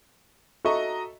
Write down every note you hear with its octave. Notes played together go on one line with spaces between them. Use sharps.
F#4 A4 D#5 E5 A#5 C#6